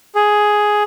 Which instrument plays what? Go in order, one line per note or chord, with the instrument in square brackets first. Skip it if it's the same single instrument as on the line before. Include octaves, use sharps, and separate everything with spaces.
[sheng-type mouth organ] G#4